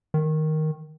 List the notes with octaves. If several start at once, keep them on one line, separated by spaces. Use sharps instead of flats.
D#3